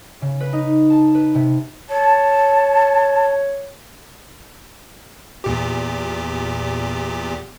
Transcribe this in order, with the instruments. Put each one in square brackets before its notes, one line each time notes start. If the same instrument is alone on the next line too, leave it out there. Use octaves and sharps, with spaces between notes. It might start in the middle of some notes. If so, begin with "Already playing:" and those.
[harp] C#3
B4
D#4
A5
B4
C3
[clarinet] C#5 [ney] A5
[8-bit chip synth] E2 A#2 G4